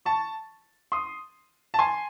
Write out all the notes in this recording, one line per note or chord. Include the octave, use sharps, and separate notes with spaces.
A5 C#6
C6 D#6
A5
G#5 C6